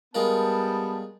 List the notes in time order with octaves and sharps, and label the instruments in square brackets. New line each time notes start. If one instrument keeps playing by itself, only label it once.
[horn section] G3 B3 A5 [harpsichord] G#3 F4 A#4